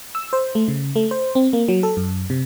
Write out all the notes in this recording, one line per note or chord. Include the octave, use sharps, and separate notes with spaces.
E6
C5
A3
C#3
A3
C5
C4
A#3
F#3
A4
F#2
C3